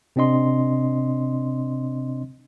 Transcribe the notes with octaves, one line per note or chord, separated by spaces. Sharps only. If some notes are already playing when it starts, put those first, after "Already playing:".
C3 C4 D4 D#5 C6